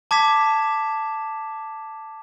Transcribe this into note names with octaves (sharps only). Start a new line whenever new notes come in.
A5 D6 G#6 B6 E7